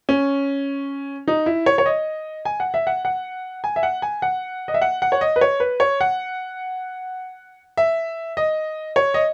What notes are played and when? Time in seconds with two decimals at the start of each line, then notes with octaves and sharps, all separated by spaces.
0.09 C#4
1.28 D#4
1.46 E4
1.66 C#5
1.78 C#5
1.86 D#5
2.45 G#5
2.60 F#5
2.74 E5
2.87 F#5
3.05 F#5
3.64 G#5
3.76 E5
3.83 F#5
4.02 G#5
4.22 F#5
4.68 D#5
4.74 E5
4.82 F#5
5.02 F#5
5.12 C#5
5.21 D#5
5.36 B4
5.41 C#5
5.60 B4
5.80 C#5
6.01 F#5
7.77 E5
8.37 D#5
8.96 C#5
9.14 D#5